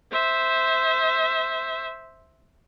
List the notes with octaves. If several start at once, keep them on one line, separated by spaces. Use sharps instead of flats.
C5 E5